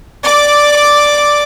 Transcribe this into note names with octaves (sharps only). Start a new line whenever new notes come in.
D5 D6